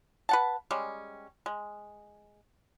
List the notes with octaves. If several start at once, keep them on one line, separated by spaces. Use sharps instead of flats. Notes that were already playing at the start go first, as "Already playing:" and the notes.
B4 F#5 A5
G3 G#3 C#4
G#3